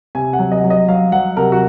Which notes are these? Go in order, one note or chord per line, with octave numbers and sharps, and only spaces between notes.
C3 G#5
F#5
F#3
D#5
F#3
D#5
F#3 F5
F#3 F#5
C3 A#4
F#4